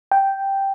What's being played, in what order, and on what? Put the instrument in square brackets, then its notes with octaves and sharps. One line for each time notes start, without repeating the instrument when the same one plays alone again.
[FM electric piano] G5